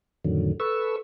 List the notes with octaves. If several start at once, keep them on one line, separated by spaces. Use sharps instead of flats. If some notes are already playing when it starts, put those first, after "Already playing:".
F2 A2 D3 D#3 F#3
A4 B4 C#6 E6